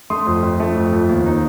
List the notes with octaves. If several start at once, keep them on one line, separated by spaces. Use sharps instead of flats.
A3 C6 D#6
F2
F2
A3
F2
F2
D#2
D#4